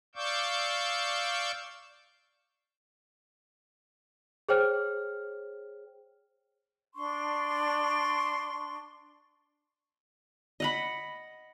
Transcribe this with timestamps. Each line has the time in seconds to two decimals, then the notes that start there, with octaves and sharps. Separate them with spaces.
0.15 D5 F5 C#6 D6 E6 G6
4.49 G#4 C5 C#5 G5 F6
6.94 D4 C6 C#6
10.60 D#5 F#5 B5